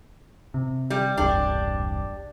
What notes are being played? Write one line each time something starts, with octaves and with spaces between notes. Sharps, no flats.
C3
G3
E1 C2 G2 D4 G4